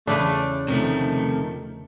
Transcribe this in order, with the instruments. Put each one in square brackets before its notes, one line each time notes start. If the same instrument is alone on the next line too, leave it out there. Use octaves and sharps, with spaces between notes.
[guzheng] E2 C#3 B4 [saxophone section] A3 D5 [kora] D4
[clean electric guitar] C3 F3 A3 [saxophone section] D#3